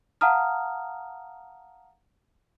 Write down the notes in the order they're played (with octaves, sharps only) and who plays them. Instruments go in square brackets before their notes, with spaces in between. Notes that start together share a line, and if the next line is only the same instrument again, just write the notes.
[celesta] F5 F#5 A5 A#5 D#6 F6